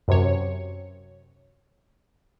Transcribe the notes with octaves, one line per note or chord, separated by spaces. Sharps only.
F#2 C3 C#5